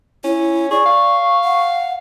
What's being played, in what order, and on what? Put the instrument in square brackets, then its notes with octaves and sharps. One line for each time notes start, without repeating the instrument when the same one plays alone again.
[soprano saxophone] C#4 [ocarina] E4
[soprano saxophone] G#4 [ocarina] D5 [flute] C#6
[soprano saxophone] F5
[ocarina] F#5